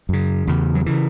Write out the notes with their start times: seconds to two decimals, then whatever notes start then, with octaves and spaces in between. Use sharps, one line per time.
0.09 F#2 C#3
0.47 E2 C#3
0.75 F#3
0.86 C#3 E3